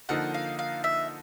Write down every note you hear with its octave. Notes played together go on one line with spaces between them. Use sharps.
D3 F3 A#3 D#4 F#5
F5
F5
E5